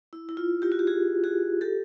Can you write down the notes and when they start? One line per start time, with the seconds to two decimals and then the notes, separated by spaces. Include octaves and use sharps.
0.13 E4
0.29 E4
0.37 F4
0.62 F4 G4
0.72 F#4
0.79 G4
0.87 F#4 G#4
1.24 F#4 G#4
1.61 G4 A4